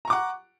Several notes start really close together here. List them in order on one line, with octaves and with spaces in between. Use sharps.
A#5 C#6 D6 F#5